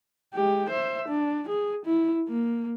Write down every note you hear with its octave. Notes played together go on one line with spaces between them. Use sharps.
G#3 G4
C5 E5
D4
G#4
E4
A#3